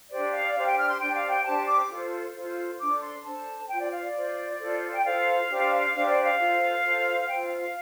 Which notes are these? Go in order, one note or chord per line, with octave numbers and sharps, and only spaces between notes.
D4 G4 C5 D5
F5
D5
D4 G4 C5 F5
G5
F6
C6
D4 G4 C5 G5
F5
G5
D4 G4 C5 A5
D6
F4 A4 C5
F4 A4 C5
D4 A4 C5 D6
C6
D4 A4 C5 A5
F4 C5 G5
D5
F5
D5
F4 C5
F4 A4 C5
G5
F4 A4 C5 F5
D4 G4 C5
D4 G4 C5 F5
D5
F5
F4 A4 C5
F4 A4 C5
F4 A4 C5 G5
F5
F5